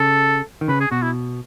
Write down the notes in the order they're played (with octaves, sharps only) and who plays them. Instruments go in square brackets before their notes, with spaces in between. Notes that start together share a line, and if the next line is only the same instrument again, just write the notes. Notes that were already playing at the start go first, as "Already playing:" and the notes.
Already playing: [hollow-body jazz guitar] C#3 [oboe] A4
[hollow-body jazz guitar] D#3
[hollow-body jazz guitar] C#3 [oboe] B4
[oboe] G#4
[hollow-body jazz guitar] B2 [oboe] F#4
[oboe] E4